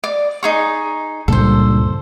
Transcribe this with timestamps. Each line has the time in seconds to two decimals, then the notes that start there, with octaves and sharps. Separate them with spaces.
0.04 D5 D6
0.43 D#4 G#4 C#6
1.28 C#2 G2 A#2 A4 C5